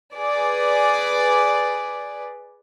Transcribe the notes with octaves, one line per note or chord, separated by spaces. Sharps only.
G#4 B4 D5